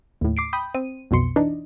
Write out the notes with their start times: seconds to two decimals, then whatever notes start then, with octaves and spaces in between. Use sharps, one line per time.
0.21 D#2 A2
0.37 D6 C7 D7
0.53 G5 B5 D#6 G6
0.75 C4 D#7
1.11 B1 F2 B2 C6 C#7
1.36 E3 D4 D#4